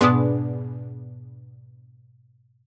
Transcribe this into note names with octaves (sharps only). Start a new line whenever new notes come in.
G#2 B2 B3 D4 G#4